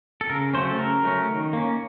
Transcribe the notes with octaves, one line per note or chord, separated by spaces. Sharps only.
A4
C#3 A#4
F#3 A3 C#4 C5
A4
C#3 A#4
F#3 A3 C#4
D#3
A#3 C#4